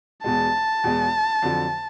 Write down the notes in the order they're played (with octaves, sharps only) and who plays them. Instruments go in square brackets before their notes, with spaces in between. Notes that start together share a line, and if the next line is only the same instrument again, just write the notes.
[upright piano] E2 B2 G#3 [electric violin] A5
[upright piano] E2 B2 G#3
F2 D3 F#3